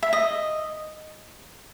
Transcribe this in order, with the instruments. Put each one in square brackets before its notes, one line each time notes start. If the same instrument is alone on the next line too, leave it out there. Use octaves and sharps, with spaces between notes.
[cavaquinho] E5
D#5